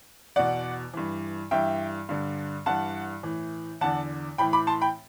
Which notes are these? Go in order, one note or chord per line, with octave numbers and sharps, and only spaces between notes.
E2 B2 D5 F#5
G2 E3
G2 E3 E5 G5
G2 D3
G2 E3 F#5 A5
A2 E3
E2 D3 F#5 A5
A2 E3 G5 B5
B5 D6
A5 C6
G5 B5